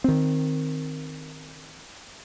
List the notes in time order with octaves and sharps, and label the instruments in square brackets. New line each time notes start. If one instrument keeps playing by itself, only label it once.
[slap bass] D#3 C4